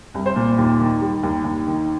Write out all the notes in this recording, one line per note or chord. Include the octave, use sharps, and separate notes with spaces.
C2
C5
A#2
D#2
D#3
G3
D#2
D#2
D#3